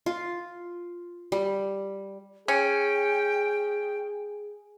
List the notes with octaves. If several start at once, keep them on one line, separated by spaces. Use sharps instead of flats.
F4
G3
C#4 G#4 G5